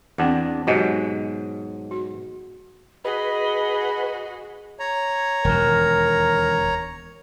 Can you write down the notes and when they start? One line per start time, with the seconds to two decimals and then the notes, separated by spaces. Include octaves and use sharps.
0.18 E2 C4 D4 F#5
0.67 G#2 B2 F#3 G4 D#5 G#5
1.91 F#4
3.05 F#4 G#4 B4 D#5
4.79 C#5 A#5
5.45 E1 D#2 A#4